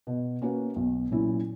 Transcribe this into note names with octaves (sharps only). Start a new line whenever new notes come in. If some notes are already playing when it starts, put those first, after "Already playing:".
B2
A#3 C#4 F#4 B4
B1
A#2 F#3 C#4 E4